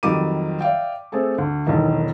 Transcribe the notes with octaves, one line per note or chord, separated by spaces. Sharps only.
F2 D#3 F#3 G3 D6 D#7
D5 E5 F5 G5
A3 C4 G#4 A4
D2
E1 B1 E2 D#3